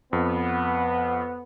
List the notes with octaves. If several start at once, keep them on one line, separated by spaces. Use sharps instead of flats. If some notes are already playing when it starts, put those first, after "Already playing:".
F2 B3